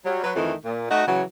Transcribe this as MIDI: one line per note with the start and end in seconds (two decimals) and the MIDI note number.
0.05 0.21 54
0.05 0.21 55
0.24 0.32 54
0.24 0.32 71
0.36 0.54 41
0.36 0.54 51
0.36 0.54 52
0.36 0.54 57
0.65 0.90 46
0.91 1.07 57
0.91 1.07 63
0.91 1.07 66
1.07 1.23 49
1.07 1.23 52
1.07 1.23 54